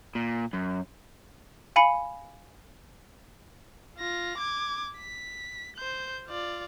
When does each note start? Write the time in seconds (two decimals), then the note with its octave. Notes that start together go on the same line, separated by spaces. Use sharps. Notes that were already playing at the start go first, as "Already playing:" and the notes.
0.15 A#2
0.53 F#2
1.76 F5 G#5 B5 C#7
3.98 F4 A#6
4.37 D6 G#6
4.98 B6
5.76 C5 G6
6.28 F4 D5